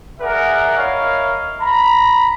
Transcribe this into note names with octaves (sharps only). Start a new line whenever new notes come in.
G#4 A#4 D5 E5 F#5
E4 A#4 C#5 D#5 F5
A#5 B5